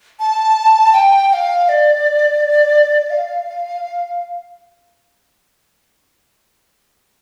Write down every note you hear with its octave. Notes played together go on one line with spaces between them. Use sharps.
A5
G5
G5
F5
F5
D5
F5